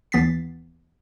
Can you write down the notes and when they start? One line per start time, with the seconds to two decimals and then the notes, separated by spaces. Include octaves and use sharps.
0.12 D#2 E3 B3 A6 B6 C7